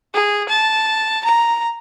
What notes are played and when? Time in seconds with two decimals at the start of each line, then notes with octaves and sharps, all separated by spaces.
0.14 G#4
0.49 A5
1.25 A#5